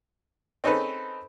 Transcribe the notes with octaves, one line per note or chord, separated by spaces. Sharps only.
C4 C#4 D#4 G#4 A4 B4